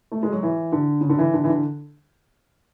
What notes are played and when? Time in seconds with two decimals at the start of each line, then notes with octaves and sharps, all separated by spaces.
0.12 A3
0.23 G#3
0.32 F#3
0.43 E3
0.72 D3
1.01 C#3
1.09 D3
1.19 E3
1.34 D3
1.44 E3
1.48 D3